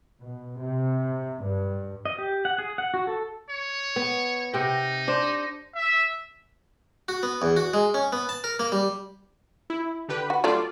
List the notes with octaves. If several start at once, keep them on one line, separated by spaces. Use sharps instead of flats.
B2
C3
G2
D#5
G4
F#5
G#4
F#5
F#4
A4
C#5
B3
C3 D#4 G5
D4 C5
E5
F#4
B3
E2
F#4
G#3
C#4
B3
A5
A#4
A#3
G3
E4
D3 G4 B4
F#4
F#3 G3 A3 F4 D5